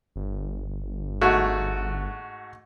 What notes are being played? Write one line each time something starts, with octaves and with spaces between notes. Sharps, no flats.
G1
G#2 A3 F#4